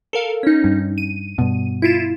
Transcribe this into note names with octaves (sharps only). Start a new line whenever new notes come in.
A4 A#4 F5
C#4 D#4
G2
D#7
G2 B2
E4 F4 E7